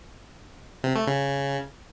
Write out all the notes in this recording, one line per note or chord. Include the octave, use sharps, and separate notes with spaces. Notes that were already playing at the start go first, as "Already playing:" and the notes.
C3
A3
C#3